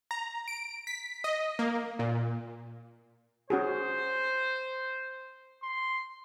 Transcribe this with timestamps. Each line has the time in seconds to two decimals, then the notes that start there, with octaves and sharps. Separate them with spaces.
0.11 A#5
0.48 D7
0.87 B6
1.24 D#5
1.59 A#3
1.99 A#2
3.50 C#4 F#4 G#4 C5
5.62 C6